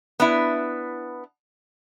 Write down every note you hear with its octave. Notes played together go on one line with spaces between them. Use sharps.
B3 D4 E4